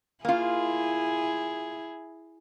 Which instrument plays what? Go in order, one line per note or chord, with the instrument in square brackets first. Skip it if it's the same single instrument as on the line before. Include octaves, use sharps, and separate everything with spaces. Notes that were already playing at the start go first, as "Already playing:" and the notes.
[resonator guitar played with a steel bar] A#3 F4 [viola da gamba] E4 G#4